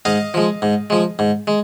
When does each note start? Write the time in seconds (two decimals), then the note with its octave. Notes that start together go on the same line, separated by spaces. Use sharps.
0.05 G#2 D#5 F5
0.34 F3 G#3
0.62 G#2
0.90 F3 G#3
1.19 G#2
1.47 G#3